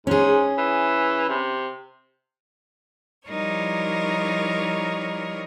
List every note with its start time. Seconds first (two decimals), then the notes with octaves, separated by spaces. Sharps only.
0.07 G#2 C#4 G#4
0.58 E3
1.29 C3
3.27 F3 G3 D#4 E4 A#4 C#5